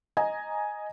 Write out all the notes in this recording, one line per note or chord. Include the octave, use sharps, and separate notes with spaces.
D#5 G#5 A#5